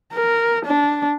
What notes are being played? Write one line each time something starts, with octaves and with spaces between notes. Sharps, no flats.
A#4
D4